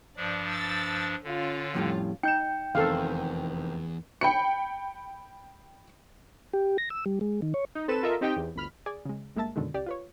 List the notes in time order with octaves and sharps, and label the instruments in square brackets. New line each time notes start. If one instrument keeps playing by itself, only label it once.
[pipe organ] G2 F3 D4 [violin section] D5
[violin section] E6 A6
[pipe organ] D3 [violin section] C#4 F4
[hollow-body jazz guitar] F2 A2 G3
[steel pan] D#4 [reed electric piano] G5 G6 [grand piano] C#7 E7
[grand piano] F1 D#3 C4 [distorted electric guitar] E2 [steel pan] A4 F5
[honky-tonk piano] G5 B5 C#7
[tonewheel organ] G4
A#6
E6
G3
G#3
D#3
C#5
[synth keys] D#4
C4 A4 B4 E7
F4 A4 A#4 D#5 E5
C4 D#4 G4 D#5 G5
E2
G1 D2 B5 F6
[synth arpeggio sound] G#4 D5 G#5
C#3 G#3
G1 G#3 A#3 E5 A5 A6
F#2 B2 D3 D#3 G#3
C#2 G4 D5
F4 B4 C#5